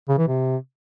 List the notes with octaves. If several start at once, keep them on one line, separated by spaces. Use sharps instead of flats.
C#3
E3
C3